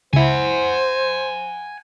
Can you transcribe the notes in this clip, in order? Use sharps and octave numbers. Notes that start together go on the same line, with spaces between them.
C#2 E4 C5 F#5 G#5